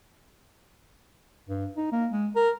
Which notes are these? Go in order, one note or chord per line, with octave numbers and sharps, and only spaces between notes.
G2
D#4
A#3
G#3
A#4